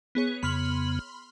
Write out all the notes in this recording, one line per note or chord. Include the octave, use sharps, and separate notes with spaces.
B3 G#4 C#5
F2 C#3 B3 B5 C6 F6